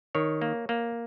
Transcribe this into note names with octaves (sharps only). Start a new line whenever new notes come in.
D#3 C#5
A#3
A#3